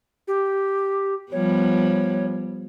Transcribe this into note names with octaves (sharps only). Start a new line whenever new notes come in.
G4
F3 G3 B3 C#5